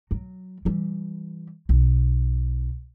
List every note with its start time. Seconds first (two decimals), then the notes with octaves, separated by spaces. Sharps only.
0.11 F#3
0.65 E3 G3
1.69 B1